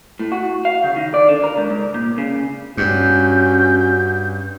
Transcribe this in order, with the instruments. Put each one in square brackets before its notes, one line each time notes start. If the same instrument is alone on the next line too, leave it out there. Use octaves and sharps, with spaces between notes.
[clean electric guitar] A2
F#4
F5
C#3
D#3
D5
D3
A#4
C#2
G#2
A#2
C#3
[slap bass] G2 [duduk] C#4 [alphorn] F#4 [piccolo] G6